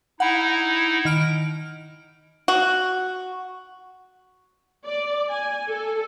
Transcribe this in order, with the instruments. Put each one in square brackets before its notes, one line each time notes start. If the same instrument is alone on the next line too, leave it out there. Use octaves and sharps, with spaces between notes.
[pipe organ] D#4 E4 [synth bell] F#5 B5
[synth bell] D#3 F6 D7
[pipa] F#4
[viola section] D5
G#5
A4